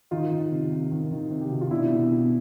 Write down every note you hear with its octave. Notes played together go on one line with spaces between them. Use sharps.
D#3 D#4 F4
D#3
C3
C3
D#3
D#3
C3
G4
C3 F#4
F4
B2 D4 E4
B2
B2